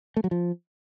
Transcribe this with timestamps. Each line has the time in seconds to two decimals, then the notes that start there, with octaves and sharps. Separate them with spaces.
0.17 A3
0.24 F#3
0.31 F3